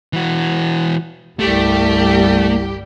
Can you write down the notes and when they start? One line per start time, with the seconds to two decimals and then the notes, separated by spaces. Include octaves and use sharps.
0.13 E3 F#4
1.39 G1 C2 G3 A3 G4